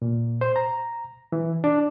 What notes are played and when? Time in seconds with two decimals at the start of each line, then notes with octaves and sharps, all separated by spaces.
0.02 A#2
0.41 C5
0.56 A#5
1.32 E3
1.64 D4